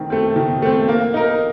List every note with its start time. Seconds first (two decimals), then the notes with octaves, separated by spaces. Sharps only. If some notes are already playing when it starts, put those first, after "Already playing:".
Already playing: D#3 A3 C4
0.10 A3 C4
0.36 D#3
0.62 A3 C4
0.88 A#3
1.14 D#4 A#4